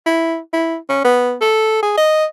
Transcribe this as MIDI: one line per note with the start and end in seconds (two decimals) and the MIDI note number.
0.06 0.38 64
0.53 0.76 64
0.89 1.04 61
1.04 1.35 59
1.41 1.78 69
1.83 1.94 68
1.97 2.25 75